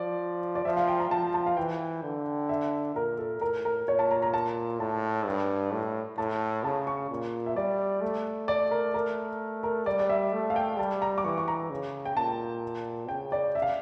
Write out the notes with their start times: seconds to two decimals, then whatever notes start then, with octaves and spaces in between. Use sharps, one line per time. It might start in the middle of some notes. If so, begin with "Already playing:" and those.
Already playing: F3 D5
0.55 D5
0.65 F3 E5
0.77 F5
0.88 G5
1.00 A#5
1.11 F3 A5
1.34 A5
1.46 F5
1.57 E3 G5
2.03 D3
2.49 E5
2.95 A#2 A#4
3.18 A4
3.41 A2 A#4
3.65 A#4
3.88 A#2 C#5
3.99 A5
4.11 A#5
4.22 A#5
4.34 A5
4.79 A2 A5
5.26 G2
5.72 A2
6.17 A2 A5
6.64 C#3 A5
6.87 C#6
7.10 A#2
7.46 E5
7.56 G3 D5
8.02 A3
8.48 D5
8.71 A#4
8.94 A#4
9.63 A#4
9.86 G3 D5
9.99 D5
10.09 E5
10.33 A3
10.50 F5
10.56 G5
10.78 G3 A5
11.02 A#5
11.18 D6
11.24 E3 C#6
11.38 C#6
11.48 A#5
11.70 C#3
12.05 G5
12.16 A#2 A5
13.09 C#3 G5
13.32 D5
13.55 E5
13.62 F5